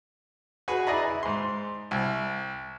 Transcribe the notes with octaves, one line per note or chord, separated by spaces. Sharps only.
F#4 G#4 B4
E4 G#4 D5 D#5 A#5 B5
E4
G#2 C6
C2